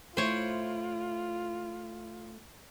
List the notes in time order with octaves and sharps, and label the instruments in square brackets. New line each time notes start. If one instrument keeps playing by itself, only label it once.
[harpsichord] A2 E4 [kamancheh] F4 [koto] C5 C#5